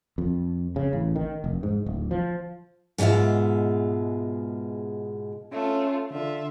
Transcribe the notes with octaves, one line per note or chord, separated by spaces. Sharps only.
F2
C#3
A1
D#3
F1
G#2
D1
F3
G#2 B2 G#3 F4 E5
A3 C#4 F4
D3 F4 E5